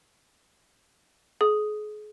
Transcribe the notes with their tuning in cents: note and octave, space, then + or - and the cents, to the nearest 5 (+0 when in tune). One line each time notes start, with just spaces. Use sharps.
G#4 +35 D#6 +0